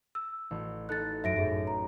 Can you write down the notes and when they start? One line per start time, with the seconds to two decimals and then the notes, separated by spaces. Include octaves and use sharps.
0.15 E6
0.51 A1 F#4
0.89 D#4 A4 F#6 A6 C#7
1.24 F#2 E5 A#6 D7
1.36 F#2 A2 G#4 E5
1.67 A#5